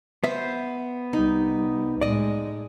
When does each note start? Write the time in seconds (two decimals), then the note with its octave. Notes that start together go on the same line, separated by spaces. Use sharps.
0.24 B3 C5 E5
1.13 C2 G3 D#4
2.01 A2 G#3 D5 D#5